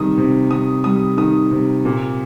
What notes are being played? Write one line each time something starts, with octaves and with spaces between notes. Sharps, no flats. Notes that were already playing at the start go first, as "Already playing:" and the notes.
Already playing: C3 D#3 G3 D#6
C3
C3 D#6
G3 D#6
D#3 D#6
C3
A#2